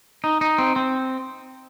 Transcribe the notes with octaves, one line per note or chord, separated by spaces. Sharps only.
D#4
D#4
C4
C4